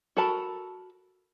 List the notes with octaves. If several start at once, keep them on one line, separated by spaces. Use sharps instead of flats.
F#4 A4 A#4 A5 B5